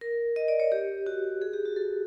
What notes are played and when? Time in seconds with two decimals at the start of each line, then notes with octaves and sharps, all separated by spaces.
0.01 A#4
0.36 D#5
0.48 D5
0.60 C#5
0.72 G4
1.06 F#4
1.42 G#4
1.53 G4
1.65 F#4
1.76 A4